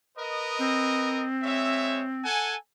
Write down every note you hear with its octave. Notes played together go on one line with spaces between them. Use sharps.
A#4 B4 D#5
C4
G#3 C#5 E5
A4 F#5 G#5